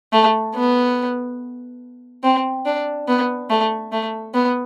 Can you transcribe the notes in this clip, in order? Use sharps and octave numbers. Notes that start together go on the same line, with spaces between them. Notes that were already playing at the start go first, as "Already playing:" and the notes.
A3
B3
C4
D4
B3
A3
A3
B3